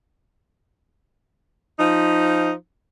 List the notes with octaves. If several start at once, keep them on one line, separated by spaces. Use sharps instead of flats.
F3 D#4